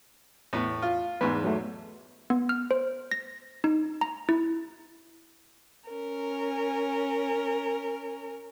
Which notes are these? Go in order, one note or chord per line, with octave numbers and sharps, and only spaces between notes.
E2 A2 B3
F4
E2 G#2 B4
F#3 A3
B3
F6
C5
A#6
D#4
A#5
E4
C#4 A#4